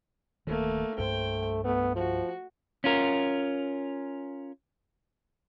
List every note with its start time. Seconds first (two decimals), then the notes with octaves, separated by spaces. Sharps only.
0.47 D1 D#3 A3 A#3
0.98 C2 G2 A3 C5 G5
1.64 A3 B3
1.96 F3 F#4
2.84 C#4 F4 A#4